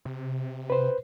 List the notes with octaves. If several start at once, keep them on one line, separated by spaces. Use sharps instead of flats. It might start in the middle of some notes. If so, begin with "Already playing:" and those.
C3
B4 C5